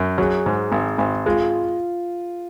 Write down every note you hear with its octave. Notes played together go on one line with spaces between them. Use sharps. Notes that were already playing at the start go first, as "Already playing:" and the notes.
Already playing: F#2
F#3 G#4
G#2
G#1
G#1
G#3 F4